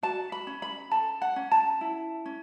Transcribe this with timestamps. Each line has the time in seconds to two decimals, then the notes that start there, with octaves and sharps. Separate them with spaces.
0.03 F#4 A5
0.32 B5
0.47 C#4
0.62 B5
0.91 A4 A5
1.22 F#5
1.36 C#4
1.51 A5
1.81 E4
2.26 C#4